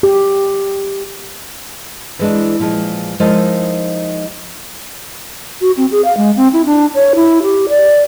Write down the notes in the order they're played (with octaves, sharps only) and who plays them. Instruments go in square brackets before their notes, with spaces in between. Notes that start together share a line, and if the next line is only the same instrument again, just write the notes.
[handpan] G4
[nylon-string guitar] E3 G#3 D4
A#2 F3 G#3
F3 G#3 D#4 E4 A#4 D#5
[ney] F#4
C4
G#4
F5
G#3
C4
E4
D4
C#5
E4
G4
D5